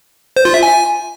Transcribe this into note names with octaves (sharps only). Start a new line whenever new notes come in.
C5
F4
E5
G#5